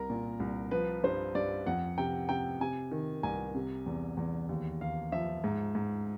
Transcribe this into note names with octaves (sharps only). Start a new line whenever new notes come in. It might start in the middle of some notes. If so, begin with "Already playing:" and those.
Already playing: C2 A#4
A#2
C2
F3 B4
G2 C5
G2 D5
F2 F#5
C3 G5
C3 G5
C3 G#5
D#3
C2 G#5
C3
E2
E2
D#2
D#2 F5
F3 E5
G#2
G#2